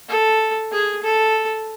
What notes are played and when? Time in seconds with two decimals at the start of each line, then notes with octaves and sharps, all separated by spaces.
0.09 A4
0.72 G#4
1.03 A4